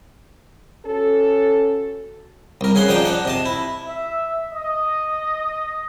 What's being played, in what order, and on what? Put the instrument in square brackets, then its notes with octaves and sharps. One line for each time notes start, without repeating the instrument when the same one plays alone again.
[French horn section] C#4 F#4 A4
[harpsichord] C2 A#4
C#3 G#4 F#5 C6
F3 D4 D#4 D5 G5 D#6
D4 F#5
C3 D#5 A5
E4
[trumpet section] E5
D#5